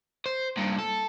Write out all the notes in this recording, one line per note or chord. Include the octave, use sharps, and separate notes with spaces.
C5
G2 A#2
A4